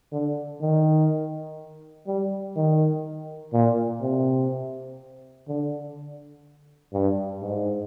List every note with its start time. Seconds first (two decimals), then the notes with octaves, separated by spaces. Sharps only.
0.12 D3
0.61 D#3
2.07 G3
2.56 D#3
3.53 A#2
4.01 C3
5.48 D3
6.93 G2
7.42 G#2